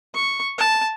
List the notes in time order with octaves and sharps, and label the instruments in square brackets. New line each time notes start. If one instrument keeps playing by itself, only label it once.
[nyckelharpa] C#6
A5